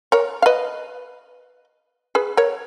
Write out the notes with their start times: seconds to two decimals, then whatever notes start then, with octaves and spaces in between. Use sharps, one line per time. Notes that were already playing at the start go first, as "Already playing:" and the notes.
0.12 A#4 C#5
0.42 F5
0.46 B4 D#5
2.15 G#4 B4
2.37 A#4 C#5